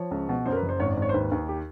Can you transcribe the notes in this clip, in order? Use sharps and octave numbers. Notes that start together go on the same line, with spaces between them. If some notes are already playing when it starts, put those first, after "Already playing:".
Already playing: F3 C#5
C#2
B2
F#2 C5
A#4
B4
F#1
C5
G#1 C#5
D5
G#1
C#5
C5
D#2 B4
D#2
G4